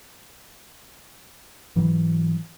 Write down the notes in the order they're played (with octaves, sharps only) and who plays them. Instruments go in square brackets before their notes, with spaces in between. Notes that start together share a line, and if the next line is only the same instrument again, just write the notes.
[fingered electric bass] G#2 E3 F#3